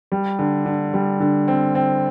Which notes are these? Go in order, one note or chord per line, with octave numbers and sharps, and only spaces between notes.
G3
D3
D3
G3
D3
C4
C4